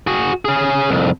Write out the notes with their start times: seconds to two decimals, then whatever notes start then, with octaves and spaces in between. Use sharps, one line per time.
0.07 F#4 G#4
0.45 C#4 G#4
0.89 C2 F2